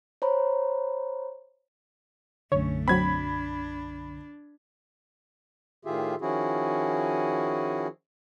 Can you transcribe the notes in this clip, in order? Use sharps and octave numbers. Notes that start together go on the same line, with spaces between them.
C5 C#5 A#5 B5
B1 F#2 D3 A3 C#4 C#5
F#3 C4 D4 B5 G#6
A2 D#3 F4 G4 G#4 E5
D#3 F3 C#4 E4 F#4 G#4